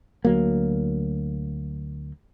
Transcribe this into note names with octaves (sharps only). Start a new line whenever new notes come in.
D2 F#3 A#3